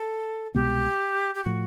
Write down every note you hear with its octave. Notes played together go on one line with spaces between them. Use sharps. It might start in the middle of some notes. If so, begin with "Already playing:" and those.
Already playing: A4
C2 B2 G#3 B3 G4
G4
A2 F3 F#4